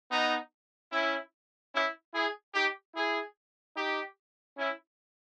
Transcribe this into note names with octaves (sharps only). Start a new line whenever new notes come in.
B3 D#4
C#4 E4
C#4 E4
E4 G#4
D#4 G4
E4 G#4
D#4 G4
C#4 E4